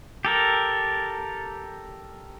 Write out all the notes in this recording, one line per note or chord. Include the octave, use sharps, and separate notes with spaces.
G4 A4 A#4